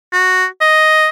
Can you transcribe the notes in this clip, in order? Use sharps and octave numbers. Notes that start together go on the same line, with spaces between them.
F#4
D#5